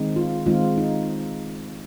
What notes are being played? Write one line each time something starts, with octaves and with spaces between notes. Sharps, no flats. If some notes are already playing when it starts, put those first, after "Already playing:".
Already playing: D#3 G#3 C4 D#4
F4
D#3 G#3 C4 D#4 F4
D#4